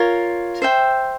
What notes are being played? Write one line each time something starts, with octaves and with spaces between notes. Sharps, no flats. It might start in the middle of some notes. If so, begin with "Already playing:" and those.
Already playing: F4 A#4 C#5
C5 E5 G5